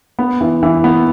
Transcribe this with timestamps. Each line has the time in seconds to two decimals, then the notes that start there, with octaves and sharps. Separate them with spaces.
0.19 B3
0.41 E3
0.63 E3
0.84 B3